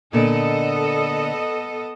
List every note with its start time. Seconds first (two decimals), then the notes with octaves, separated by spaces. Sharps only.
0.13 A#2 D3 B3 A4 D5 D#5